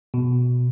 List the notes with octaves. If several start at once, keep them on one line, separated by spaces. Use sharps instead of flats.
B2